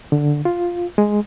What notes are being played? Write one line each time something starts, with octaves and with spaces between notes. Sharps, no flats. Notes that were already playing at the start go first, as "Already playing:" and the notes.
D3
F4
G#3